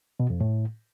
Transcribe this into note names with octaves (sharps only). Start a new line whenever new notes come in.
B2
F2
A2